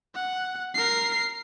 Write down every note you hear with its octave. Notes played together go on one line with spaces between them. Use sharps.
F#5
A#4 C7